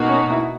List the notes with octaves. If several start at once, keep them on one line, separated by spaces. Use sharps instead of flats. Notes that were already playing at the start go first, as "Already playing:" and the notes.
Already playing: B2 A#3 D#4 F#4
C#4
E4